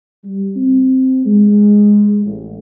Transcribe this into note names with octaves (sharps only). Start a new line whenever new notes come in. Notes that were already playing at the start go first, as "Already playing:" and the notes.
G3
C4
G#3
A1